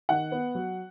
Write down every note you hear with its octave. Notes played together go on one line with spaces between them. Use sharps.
D#3 F#5
B3
F#3